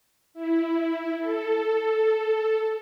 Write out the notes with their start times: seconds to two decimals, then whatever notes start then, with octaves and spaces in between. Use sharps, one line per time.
0.34 E4
1.19 A4